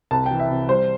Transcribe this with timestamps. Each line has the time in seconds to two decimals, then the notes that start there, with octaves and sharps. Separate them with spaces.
0.11 C2 A5
0.26 E3 G5
0.40 E5
0.50 C3
0.69 G3 C5